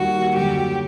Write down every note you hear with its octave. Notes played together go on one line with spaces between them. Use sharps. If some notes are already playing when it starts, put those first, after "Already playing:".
Already playing: D#2 D#3 G3 A#3 F#4
F#2 D3 F#3 G4